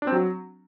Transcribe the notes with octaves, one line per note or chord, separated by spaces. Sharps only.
D4
C4
F#3